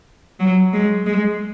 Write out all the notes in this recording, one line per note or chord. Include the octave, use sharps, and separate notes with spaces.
F#3
G#3
G#3